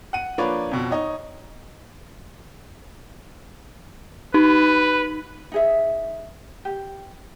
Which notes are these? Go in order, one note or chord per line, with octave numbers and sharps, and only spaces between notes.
F#5 D#7
F3 A#3 D4 B4 C#5
F2 B2
D#4 C#5 D#5
D#4 B4
D#4 G#4 E5
G4